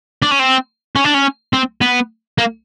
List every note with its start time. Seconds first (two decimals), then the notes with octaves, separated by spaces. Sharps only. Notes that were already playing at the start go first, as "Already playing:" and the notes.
0.22 D4
0.31 C#4
0.39 C4
0.96 C#4
1.05 D4
1.14 C#4
1.53 C4
1.81 B3
2.38 A#3